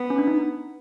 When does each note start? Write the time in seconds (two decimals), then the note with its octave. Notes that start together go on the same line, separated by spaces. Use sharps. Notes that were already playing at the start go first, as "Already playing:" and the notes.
Already playing: B3
0.10 C#4
0.18 D4
0.27 D#4